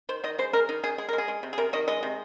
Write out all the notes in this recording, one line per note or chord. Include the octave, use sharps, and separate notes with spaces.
D#3 C5
D#3 D#5
G#3 C5
G#3 A#4
D#3 D#4
D#3 G#4
G#3 G#4
A#4
G#3
G#4
G#3
C3
G#4
C3 A#4
D#3 D#5
G#3 D#5
C3